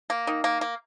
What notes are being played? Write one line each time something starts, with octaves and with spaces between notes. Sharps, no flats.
A#3
D#3
A#3
A#3